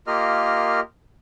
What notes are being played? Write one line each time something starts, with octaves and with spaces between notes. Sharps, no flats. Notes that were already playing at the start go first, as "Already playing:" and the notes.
A#3 F4 G4 A#4 D#5 F6